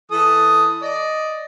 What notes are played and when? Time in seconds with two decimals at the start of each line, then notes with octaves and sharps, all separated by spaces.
0.11 E3 A4 D#6
0.82 D5 D#5